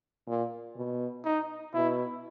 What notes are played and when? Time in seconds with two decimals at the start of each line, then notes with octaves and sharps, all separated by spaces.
0.28 A#2
0.76 B2
1.25 D#4
1.74 B2 E4